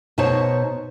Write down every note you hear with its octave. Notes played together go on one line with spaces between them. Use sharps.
B2 D#4 C5 C#5 A5